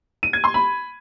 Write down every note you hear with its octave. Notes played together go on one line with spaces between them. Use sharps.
D#7
G#6
C6
B5